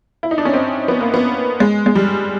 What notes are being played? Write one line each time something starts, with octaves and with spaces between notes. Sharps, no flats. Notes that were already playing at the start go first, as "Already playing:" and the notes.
E4
D#4
D4
C#4
C4
B3
A#3
B3
G#3
G#3
G3